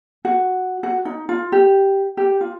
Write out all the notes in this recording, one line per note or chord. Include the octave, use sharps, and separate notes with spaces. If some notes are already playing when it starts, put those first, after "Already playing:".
F#4
F#4
D#4
F4
G4
G4
F4